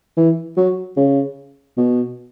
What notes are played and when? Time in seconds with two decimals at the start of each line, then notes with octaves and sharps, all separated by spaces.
0.17 E3
0.57 F#3
0.97 C#3
1.77 B2